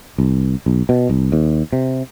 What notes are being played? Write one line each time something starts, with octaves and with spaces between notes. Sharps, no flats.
C2
B1
B2
C2
D#2
C3